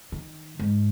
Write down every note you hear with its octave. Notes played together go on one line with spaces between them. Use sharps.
D#3
G#2